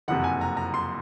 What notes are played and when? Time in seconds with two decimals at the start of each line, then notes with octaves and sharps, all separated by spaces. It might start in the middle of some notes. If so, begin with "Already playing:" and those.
0.08 F#1 F2 C3 F#5
0.24 G#5
0.41 A#5
0.57 A#5
0.74 C6